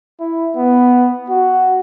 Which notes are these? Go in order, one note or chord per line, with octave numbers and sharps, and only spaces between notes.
E4
B3
F#4